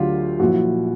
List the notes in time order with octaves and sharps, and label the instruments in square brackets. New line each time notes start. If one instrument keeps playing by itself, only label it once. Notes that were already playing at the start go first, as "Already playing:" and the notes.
Already playing: [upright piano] D2 D3 F#3 F4 G4
A#1 A#2 F#3 E4 F#4